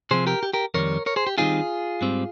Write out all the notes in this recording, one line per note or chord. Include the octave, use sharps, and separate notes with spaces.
C3 F3 C4 G#4 C5
G4 A#4
G4
G4 A#4
F2 D#3 G3 A#4 C#5
A#4 C#5
G#4 C5
G4
D#3 G3 C4 D#4 F4 G#4
G#2 G3 C4